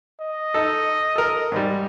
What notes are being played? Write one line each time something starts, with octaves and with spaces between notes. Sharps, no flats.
D#5
D#4 A4
A4 A#4
G#2 G3